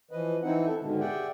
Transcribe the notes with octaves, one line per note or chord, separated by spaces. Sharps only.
E3 F3 B4 D#5
E3 C4 D#4 E4 F#5
A4 E5
G#2 B2 D3 D#3 G#3
G4 G#4 D5 E5 F#5 G5